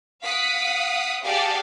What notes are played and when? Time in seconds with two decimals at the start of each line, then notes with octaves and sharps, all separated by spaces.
0.22 F5 F#5 D#6 B6 D7
1.22 G4 G#4 D5 F5 F#5 A5